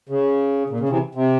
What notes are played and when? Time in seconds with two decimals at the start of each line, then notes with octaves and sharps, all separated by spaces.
0.09 C#3
0.70 A#2
0.80 C#3
0.89 C3 E3
1.15 C3